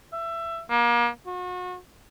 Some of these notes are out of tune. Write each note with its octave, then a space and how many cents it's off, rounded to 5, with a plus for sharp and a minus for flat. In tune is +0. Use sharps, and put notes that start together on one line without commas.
E5 +20
A#3 +35
F#4 -35